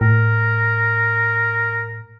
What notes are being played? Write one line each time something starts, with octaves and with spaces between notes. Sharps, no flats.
A2 A#4